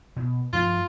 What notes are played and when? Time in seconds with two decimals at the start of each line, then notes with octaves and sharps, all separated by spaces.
0.16 B2
0.53 G2 F3 A3 F4